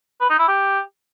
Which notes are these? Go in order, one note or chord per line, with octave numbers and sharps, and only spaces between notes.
B4
D#4
E4
G4